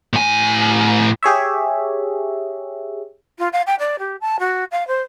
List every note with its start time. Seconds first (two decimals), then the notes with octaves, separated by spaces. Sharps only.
0.13 A2 G#5
1.23 G4 G#4 C#5 E5
3.38 F4
3.52 F5
3.66 G5
3.79 D5
3.99 G4
4.20 A5
4.39 F#4
4.71 F5
4.87 C5